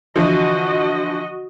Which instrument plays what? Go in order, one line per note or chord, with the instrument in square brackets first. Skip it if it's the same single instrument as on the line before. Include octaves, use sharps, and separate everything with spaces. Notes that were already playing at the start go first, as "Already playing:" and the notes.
[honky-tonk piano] D3 E3 F3 [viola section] F#4 D#5